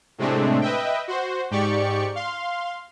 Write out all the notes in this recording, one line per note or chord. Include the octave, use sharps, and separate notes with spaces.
A2 C3 G#3 A3 C4 D4
B4 D#5 E5 G5
F#4 C5
G#2 G4 D5 C#6 C#7
F5 C6